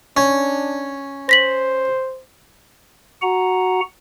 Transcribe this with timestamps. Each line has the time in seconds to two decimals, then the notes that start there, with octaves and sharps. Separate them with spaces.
0.17 C#4 D4
1.29 C5 A#6 B6 F#7
3.22 F#4 F#5 A#5